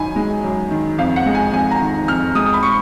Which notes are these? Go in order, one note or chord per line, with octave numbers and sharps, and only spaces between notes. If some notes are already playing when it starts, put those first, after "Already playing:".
Already playing: F#2 D#3 D#4 G#5 B5
G#3
F#2
D#3
F2 F5
F#5
G#3
G#5
F2 G#5
A#5
D#3
F2 F6
G#3 D#6
B5
C#6